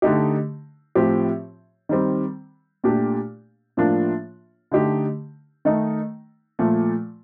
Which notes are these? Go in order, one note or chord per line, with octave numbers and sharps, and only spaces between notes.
D3 A3 D#4 G4
A2 F3 C4 G4
D#3 G3 C4
A#2 A3 D4 G4
A2 F3 A#3 D4 F4
D3 A3 D#4 G4
D#3 A3 D#4
A#2 F3 A3